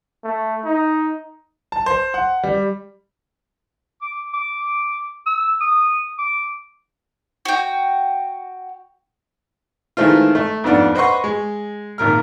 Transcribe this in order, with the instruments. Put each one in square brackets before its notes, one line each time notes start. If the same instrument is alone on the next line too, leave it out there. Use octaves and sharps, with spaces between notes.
[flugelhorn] A3
D#4
[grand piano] A5
C5
F#5
G3
[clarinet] D6
D6
E6
D#6
D6
[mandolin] F#4 G5
[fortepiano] D#3 E3 G#3 A3 C4 F4
A3
F2 G#2 B3 D4 F4 D5
B4 C5 D#5 F#5 C6 C#6
G#3
G#1 A#2 A#4 F6